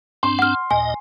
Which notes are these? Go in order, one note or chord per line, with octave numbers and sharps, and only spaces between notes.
G2 C4 D4 C6
F#5 F6
D#2 A#2 D#5 G#5